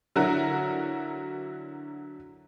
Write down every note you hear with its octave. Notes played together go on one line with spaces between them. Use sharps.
D3 F#3 E4 F#4 A#4